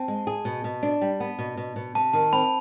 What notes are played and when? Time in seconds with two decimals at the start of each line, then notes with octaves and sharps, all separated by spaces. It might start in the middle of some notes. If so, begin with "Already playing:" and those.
Already playing: C4 A5
0.08 G#3
0.27 G#4
0.45 B2
0.64 B2
0.83 D4
1.01 G3
1.20 B3
1.39 B2
1.57 B2
1.76 B2
1.95 C3 A5
2.13 D#3 A5
2.33 C4 B5